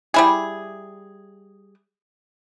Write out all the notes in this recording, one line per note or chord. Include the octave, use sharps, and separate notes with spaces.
G3 E4 G#4